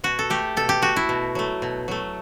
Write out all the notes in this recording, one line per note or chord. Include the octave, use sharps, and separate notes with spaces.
B2 F#4
A4
A3 G4
B2 A4
G4
A3 F#4
E4
B2
F#3 A3
B2
F#3 A3